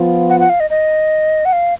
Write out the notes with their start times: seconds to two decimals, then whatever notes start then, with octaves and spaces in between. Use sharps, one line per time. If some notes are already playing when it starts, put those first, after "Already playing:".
Already playing: F3 B3 F4
0.30 F#5
0.40 F#5
0.49 F5
0.60 D#5
0.70 D#5
1.45 F#5
1.53 F5